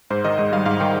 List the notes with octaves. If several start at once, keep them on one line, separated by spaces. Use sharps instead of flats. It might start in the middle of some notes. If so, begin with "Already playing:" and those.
G#2 C5
D#3 D#5
G#2 D#5
G3 F5
G#2 F5
D#3 G5